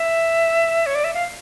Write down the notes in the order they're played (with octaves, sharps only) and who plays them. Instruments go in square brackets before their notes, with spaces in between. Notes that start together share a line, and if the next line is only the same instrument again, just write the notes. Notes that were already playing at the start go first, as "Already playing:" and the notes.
Already playing: [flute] E5
C#5
D5
E5
F5